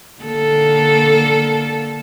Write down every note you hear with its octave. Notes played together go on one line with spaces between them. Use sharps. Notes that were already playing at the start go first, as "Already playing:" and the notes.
D3 A#3 A4